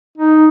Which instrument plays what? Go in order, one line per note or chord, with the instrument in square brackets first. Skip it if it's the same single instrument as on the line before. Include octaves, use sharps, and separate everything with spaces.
[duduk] D#4